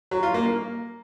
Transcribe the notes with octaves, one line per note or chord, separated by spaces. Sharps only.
F#3
F4
A#3
A#3